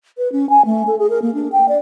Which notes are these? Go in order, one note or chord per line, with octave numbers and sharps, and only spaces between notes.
B4
C#4
G#5
A3
A4
G#4
A#4
A#3
D4
G5
D5